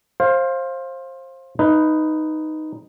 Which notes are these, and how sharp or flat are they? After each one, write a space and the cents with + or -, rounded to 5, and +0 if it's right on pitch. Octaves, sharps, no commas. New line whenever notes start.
C5 +25 F5 +0
D#4 +0 B4 +5 E5 +45